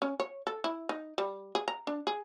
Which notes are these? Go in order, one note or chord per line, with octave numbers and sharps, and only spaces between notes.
C#4
C#5
A4
E4
D#4
G3
G#4
A#5
D4
G#4